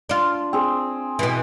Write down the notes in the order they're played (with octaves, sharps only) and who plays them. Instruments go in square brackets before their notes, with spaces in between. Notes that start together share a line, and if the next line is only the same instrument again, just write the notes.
[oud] D4 F4
[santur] C4 G#4
[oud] B2 E3